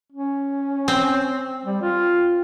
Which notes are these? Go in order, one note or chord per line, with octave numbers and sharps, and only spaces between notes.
C#4
C4
G3
F4